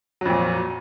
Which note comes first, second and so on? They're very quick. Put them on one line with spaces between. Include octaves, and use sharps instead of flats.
F#3 F2 A#2